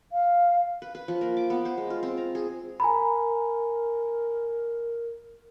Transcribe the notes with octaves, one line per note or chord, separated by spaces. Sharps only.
F5
B4
B4
F3
A#3
D6
B3
C5
G#3
F4
C4
A#5
G#4
A#4 G#5 A#5 B5